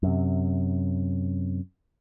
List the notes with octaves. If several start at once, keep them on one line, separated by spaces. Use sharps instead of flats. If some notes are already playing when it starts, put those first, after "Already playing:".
F#2 C3